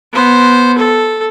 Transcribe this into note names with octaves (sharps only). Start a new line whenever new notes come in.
B3 C5
A4